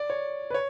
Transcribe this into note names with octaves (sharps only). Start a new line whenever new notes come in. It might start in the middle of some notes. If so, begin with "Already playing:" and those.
Already playing: D5
C#5
B4
C#5